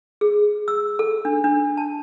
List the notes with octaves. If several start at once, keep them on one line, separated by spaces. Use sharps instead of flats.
G#4
E6
A4
D4
D4
A5